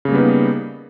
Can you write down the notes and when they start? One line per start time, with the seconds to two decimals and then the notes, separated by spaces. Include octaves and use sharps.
0.05 C#3
0.08 A#3
0.11 G3
0.15 B3
0.18 D#4